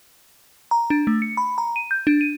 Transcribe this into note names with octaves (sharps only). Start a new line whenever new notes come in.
A#5
D4
A3
C#7
B5
A#5
D#7
G6
D4
D#7